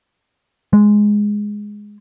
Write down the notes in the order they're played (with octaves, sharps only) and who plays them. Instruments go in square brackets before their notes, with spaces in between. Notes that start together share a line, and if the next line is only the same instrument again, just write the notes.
[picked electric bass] G#3